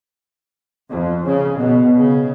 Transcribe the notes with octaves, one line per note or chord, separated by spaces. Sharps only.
F2
C#3
B2
C#3